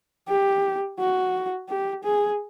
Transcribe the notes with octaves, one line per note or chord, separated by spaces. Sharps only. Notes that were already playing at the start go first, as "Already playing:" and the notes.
G4
F#4
G4
G#4